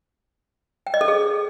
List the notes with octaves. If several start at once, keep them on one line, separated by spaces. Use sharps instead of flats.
G5
D#5
A4
G#4